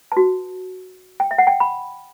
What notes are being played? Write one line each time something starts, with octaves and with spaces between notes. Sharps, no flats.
F#4 B4 A5
G5
E5
F#5
G5
B5